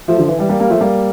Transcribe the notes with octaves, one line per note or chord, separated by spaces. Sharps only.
F3 A3
D3 F3
E3
E3 G3
G3 A#3
G3 A#3
F3 A3
G3 A#3